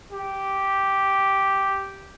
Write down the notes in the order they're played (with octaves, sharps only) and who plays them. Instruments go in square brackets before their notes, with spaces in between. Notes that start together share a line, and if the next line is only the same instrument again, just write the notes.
[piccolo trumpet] G4